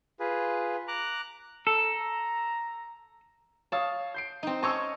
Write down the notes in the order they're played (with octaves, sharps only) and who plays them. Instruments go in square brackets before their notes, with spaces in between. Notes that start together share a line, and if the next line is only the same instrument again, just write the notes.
[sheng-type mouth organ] F4 G#4 B4
A#5 D6 F#6
[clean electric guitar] A4 [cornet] A#5
[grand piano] C#5 F5 D#6 [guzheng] A5
[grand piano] G6 C7 D7
[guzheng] C4 D#4
[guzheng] C#4 C#5 D#5 [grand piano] A5 C#6 E6